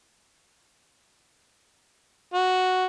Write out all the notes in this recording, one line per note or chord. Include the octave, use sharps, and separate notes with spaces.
F#4